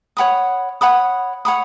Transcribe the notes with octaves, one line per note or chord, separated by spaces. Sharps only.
C#5 F#5 B5 D#6
C#5 F#5 B5 D#6
C#5 F#5 B5 D#6